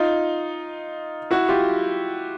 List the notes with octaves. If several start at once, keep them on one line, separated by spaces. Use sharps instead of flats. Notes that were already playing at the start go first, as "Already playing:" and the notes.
Already playing: D#4 F4
E4 F#4
F4 G4